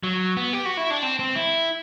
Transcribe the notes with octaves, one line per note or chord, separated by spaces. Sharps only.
F#3
B3
G4
F#4
E4
D4
C4
C4
E4